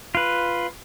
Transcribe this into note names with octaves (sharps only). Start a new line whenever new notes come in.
F4 B4